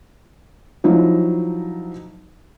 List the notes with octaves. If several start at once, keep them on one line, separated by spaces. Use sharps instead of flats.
F3 F#3 D#4 E4